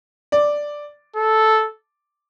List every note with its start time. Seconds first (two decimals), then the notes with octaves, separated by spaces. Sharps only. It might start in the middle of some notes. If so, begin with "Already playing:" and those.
0.32 D5
1.16 A4